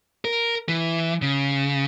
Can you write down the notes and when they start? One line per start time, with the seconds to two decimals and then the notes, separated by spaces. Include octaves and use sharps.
0.25 A#4
0.69 E3
1.22 C#3